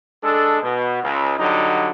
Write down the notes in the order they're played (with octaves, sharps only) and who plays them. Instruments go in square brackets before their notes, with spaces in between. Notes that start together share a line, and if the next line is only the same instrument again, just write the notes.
[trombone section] G#3 D4 A4
B2
C#2
D3 F#3 G3 D#4